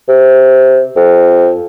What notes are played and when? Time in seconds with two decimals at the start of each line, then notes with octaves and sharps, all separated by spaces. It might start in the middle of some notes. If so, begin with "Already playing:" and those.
0.09 C3
0.96 F2